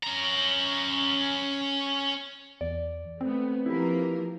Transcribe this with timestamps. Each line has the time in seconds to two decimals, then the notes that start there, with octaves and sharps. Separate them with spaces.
0.03 C#4 A#5
2.61 E2 D5
3.21 A3 B3 C4
3.66 F3 A#3 E4 G4 A#4 B4